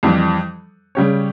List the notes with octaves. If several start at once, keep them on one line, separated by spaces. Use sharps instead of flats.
F2 E3 G3
C#3 G3 C#4 G4 C#5